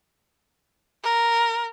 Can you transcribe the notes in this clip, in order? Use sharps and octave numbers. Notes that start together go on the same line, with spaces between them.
A#4